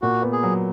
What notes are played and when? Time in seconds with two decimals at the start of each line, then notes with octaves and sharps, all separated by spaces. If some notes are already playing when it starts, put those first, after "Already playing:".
0.02 A#2 F#4
0.22 B3
0.33 G#4
0.43 F#3